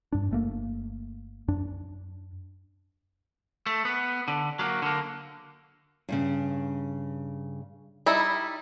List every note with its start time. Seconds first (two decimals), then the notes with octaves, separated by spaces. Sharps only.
0.12 G2 D4
0.31 G1 A3 A#3
1.48 F#2 D4
3.66 A3
3.85 B3
4.28 D3
4.59 F#3 A#3
4.82 D3 A#3
6.09 G2 A#2 C#3
8.06 G3 D#4 E4